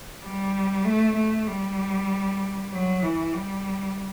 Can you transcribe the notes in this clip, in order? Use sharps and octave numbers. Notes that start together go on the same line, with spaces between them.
G3
A3
A3
G3
F#3
E3
G3